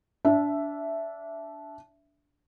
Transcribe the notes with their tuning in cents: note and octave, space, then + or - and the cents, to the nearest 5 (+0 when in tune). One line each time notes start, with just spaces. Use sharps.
D4 -20 E5 +5